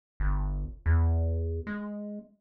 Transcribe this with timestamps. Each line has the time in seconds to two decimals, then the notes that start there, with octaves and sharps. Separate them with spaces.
0.20 G1
0.86 E2
1.67 G#3